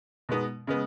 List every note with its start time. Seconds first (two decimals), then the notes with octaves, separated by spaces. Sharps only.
0.29 B2 G#3 B3 D#4
0.67 C#3 G#3 B3